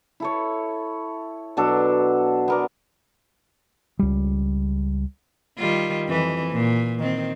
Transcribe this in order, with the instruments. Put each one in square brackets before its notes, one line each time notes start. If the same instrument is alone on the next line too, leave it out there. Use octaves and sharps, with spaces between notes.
[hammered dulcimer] E4 A4 C#5
B2 F#3 D4 A4
B3 A#4 D5
[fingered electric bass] C#2 G3
[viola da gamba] D#3 G3 F4
F2 E3
A#2
D#3 C4